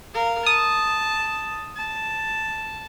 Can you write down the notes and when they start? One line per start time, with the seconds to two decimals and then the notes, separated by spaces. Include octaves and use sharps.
0.15 A#4 F5
0.46 A5 D#6
1.77 A5